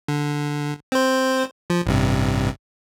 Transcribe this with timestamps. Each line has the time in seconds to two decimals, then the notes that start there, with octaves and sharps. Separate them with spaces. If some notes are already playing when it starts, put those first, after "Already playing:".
0.08 D3
0.92 C4 C5
1.70 F3
1.86 A1 G2 C3